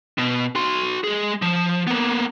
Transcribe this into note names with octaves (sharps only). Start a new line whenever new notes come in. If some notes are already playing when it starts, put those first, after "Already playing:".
B2
F#4 C6
G#3 G#4
F3
A#3 B3